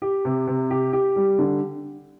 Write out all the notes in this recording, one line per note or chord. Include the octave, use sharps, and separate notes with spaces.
G4
C3
C3
G4
G4
G3
D3